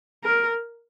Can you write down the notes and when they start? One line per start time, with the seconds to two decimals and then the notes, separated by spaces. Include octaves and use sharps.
0.24 A#4